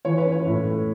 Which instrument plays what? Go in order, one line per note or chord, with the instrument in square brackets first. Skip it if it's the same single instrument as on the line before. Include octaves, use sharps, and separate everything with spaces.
[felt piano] E3 C#5
B4
C#4
C#5
A2
A3